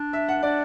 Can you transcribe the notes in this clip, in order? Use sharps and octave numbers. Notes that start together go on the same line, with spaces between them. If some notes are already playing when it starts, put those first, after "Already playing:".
Already playing: D4
E5
F#5
D4 D5